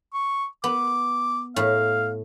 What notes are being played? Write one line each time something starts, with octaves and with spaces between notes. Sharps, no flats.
C#6
B3 D6
A2 F5